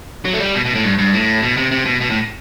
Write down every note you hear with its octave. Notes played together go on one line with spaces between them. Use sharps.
F#3
A3
G3
B2
B2
A2
G2
G2
A2
B2
C3
C3
B2
B2
A2